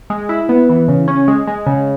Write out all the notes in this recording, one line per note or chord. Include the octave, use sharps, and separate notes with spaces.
G#3
E4
B3
E3
C#3
C#4
G#3
G#3
C#3